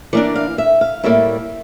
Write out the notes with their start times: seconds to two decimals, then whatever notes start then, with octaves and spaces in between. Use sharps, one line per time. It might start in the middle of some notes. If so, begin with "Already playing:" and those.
0.13 E3 A#3 D4 D5
0.35 F5
0.58 E5
0.81 F5
1.04 A2 G3 A#3 E5